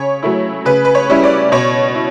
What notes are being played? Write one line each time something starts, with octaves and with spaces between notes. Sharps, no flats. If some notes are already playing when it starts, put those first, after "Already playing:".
Already playing: C#3 C#5
F#3 A3 E4
C#3 B4
B4
C#5
G3 C#4 E4
D5
B2 C#5
E4